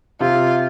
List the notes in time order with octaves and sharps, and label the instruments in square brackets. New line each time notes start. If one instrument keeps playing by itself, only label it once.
[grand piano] C3 [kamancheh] F4